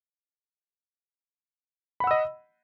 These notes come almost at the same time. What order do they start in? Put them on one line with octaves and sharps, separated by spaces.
B5 F#5 E6 D#5